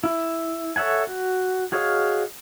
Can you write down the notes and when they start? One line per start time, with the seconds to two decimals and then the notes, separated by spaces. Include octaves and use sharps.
0.04 E4
0.76 A4 C#5 E5 F#5 G#5
1.07 F#4
1.72 F#4 G#4 C#5 D#5 F5